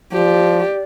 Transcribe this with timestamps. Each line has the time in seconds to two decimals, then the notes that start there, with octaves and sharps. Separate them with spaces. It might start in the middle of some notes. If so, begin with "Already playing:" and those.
0.13 F3 G4 D5